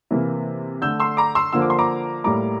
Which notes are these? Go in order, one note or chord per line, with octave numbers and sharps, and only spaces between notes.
C3 E3 A#3
D3 A3 E6 G6
C6 E6
A#5 D6
C6 E6
D3 F3 A#3 E6
D6
C6
A#5 D6
A2 G3 A#3 A#5 D6